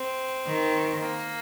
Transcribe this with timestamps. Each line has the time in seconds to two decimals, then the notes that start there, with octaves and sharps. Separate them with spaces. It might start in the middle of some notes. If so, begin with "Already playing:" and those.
Already playing: C4
0.47 D#3
1.01 A#3